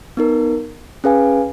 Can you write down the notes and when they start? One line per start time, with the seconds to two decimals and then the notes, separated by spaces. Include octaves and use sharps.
0.17 B3 D#4 A#4
1.04 C#4 G#4 B4 F5 G#5